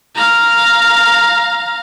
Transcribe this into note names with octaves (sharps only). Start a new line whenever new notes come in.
F5 A#5